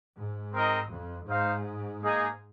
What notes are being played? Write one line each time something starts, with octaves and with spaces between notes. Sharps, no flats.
G#2
C4 D#4 A#4 D#5
F2
G#2 D#4 C5 F5
A#3 D#4 G#4 D#5